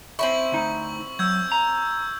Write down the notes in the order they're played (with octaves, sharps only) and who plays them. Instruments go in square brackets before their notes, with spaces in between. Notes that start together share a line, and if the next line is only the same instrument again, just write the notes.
[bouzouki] C4 C#4 E4 [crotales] C#6 F#7
[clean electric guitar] D2 D#4
[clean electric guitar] F#3 [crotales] E6 G6 G#6
[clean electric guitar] A#5